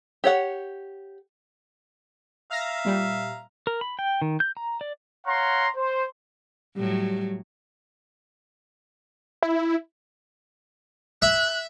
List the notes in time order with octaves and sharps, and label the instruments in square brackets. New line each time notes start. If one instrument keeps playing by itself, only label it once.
[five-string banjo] G4 C#5 F#5
[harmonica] E5 F5 A#5 [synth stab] F6 A#6
[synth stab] A#2 G3
[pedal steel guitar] A#4
B5
G5
D#3
G6
A#5
D5
[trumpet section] C#5 F5 F#5 A#5 C6
C5
[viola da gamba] A2 F#3 [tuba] G3
[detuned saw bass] E4
[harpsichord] E5 [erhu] F#6